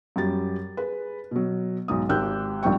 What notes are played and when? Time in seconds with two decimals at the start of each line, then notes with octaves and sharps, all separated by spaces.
0.16 F#2 G3 G4 A6
0.77 G#4 B4
1.31 B2 F#3
1.88 B1 G#2 D#6
2.09 G#1 G4 G5 E6 F#6 G6
2.63 A#1 G#2 G3 C4 G5 C#6